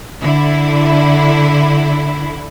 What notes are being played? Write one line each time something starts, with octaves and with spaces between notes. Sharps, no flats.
D3 E4